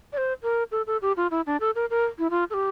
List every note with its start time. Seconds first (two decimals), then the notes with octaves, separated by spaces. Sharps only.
0.13 D5
0.17 C5
0.43 A#4
0.72 A4
0.87 A4
1.02 G4
1.17 F4
1.31 E4
1.46 D4
1.60 A4
1.75 A#4
1.90 A#4
2.19 E4
2.30 F4
2.50 A4
2.54 G4